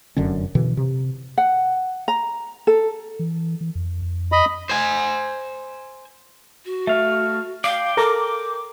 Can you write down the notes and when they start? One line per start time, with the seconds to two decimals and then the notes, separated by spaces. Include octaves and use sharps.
0.17 F1 F#2 D3 C#4
0.55 B2 D3 E3
0.77 C3
1.38 F#5
2.08 A#5
2.67 A4
3.19 E3
3.61 E3
3.75 F2
4.02 F2
4.32 D#5 B5
4.69 C5 G#5
6.65 F#4
6.87 A3 E5 F5
7.64 D5 F5 G5
7.97 A4 A#4 A#5 D6